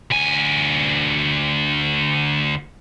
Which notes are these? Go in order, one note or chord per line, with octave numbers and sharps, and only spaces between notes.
D2 G#5